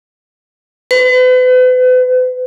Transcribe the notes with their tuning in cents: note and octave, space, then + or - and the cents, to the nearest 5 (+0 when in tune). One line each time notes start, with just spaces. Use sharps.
B4 +40